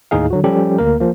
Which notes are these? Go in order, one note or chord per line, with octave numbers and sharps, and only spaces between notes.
D#2 A2 D#4 G#4 F5
D3 F#3 F#4
F3 G3 C#4 G4 A4
D2 A#3 A#4
F3 A#3